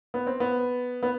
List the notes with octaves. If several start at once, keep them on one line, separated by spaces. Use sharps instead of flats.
B3
C4
B3
B3